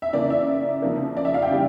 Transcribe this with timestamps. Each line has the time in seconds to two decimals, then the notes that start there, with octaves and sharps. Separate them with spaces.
0.02 E5
0.13 C#3 E3 A#3 D5
0.30 E5
0.82 C#3 F3 A#3
1.17 D5
1.25 E5
1.34 F5
1.42 G5
1.51 C#3 E3 G3